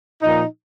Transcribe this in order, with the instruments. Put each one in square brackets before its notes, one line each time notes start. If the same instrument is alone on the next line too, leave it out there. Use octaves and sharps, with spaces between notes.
[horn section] A#2 F3 D#4